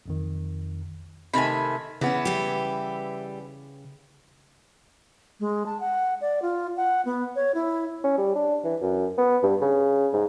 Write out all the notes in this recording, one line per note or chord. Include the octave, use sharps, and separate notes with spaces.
B1 F2 D#3
C3 D#3 A3 G#5 B5
C#3 E3 B3 C#4 E5
G3 G4
G#3
A5
F#5
D5
F4
F#5
B3
C#5
E4
C#4
G3
D4
E3
F#2
B3
G2
C#3
G#2